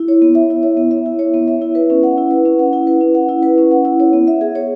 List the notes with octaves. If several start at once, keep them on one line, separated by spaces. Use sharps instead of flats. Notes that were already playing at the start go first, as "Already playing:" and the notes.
Already playing: E4
C#5
B3
E5
E4
C#5
B3
E5
E4
C#5
B3
E5
E4
B4
C#4
F#5
E4
B4
C#4
F#5
E4
B4
C#4
F#5
E4
B4
C#4
F#5
E4
C#5
B3
E5
G#4
C#5